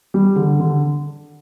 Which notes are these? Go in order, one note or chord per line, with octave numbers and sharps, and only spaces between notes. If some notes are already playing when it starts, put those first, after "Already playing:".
G3
D3
D3